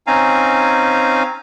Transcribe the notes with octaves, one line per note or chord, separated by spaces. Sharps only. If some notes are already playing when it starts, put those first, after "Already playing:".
C4 C#4 D#4 F5 G#5 A#5